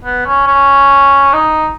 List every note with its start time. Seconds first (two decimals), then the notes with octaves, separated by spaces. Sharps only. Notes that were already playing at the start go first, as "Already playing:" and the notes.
0.04 B3
0.26 C#4
0.47 C#4
1.33 D#4